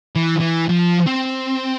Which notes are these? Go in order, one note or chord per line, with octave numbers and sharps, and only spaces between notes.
E3
E3
F3
C4